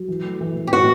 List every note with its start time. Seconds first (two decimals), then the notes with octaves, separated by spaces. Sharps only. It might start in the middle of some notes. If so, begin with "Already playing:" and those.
Already playing: F#3
0.08 E3
0.24 A3
0.41 E3
0.57 E3
0.67 G4
0.73 A2 F#4